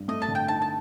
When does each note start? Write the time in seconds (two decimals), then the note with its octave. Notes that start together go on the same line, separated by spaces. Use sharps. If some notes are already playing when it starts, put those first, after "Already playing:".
Already playing: G2
0.08 A3 D#5
0.22 A5
0.28 D3
0.35 G5
0.48 D#4 A5
0.62 A5